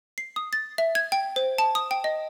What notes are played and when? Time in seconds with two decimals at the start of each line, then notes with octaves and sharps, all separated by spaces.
0.18 C7
0.36 D#6
0.53 A6
0.78 E5
0.95 G#6
1.12 G5
1.36 C5
1.58 A5
1.75 D#6
1.91 G5
2.04 D#5